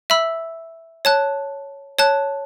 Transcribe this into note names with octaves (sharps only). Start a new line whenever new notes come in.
E5 B5 E6
C#5 A5 F#6
C#5 A5 F#6